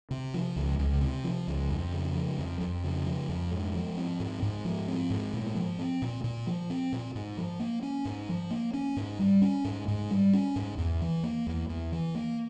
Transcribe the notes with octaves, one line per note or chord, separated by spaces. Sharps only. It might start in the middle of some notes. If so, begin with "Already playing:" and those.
C3
F3
C#2
C#2
C3
F3
C#2
F2
C#3
F3
F2
F2
C#3
F3
F2
G#2
F3
C4
G#2
G#2
F3
C4
G#2
A#2
F3
C4
A#2
A#2
F3
C4
A#2
G#2
F3
A#3
C#4
G#2
F3
A#3
C#4
G#2
G3
C#4
G#2
G#2
G3
C#4
G#2
E2
E3
A#3
E2
E2
E3
A#3